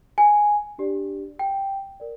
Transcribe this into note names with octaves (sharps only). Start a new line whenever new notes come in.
G#5
D4 G4 D5
G5
A#4 D5